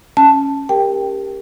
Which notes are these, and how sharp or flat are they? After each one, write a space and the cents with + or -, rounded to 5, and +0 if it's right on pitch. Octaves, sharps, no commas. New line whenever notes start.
C#4 +0 A5 +0
G4 +20 A#4 +0 G5 +0